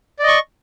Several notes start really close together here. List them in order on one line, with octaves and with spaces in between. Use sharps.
D5 D#5 C#6